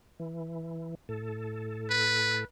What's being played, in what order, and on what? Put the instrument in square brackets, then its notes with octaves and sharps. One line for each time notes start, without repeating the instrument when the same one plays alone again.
[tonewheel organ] E3
A2 A4
[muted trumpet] B4